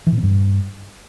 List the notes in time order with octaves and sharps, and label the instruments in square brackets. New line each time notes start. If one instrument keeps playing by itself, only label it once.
[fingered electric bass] E3
A#2
C4
G2